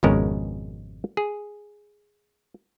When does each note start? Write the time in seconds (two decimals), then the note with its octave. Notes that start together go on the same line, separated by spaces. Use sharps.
0.03 G#1 F2 B2 G#3 C#4 A#4
1.17 G#4